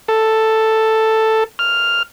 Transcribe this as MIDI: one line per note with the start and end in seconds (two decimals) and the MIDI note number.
0.08 1.44 69
1.59 2.03 89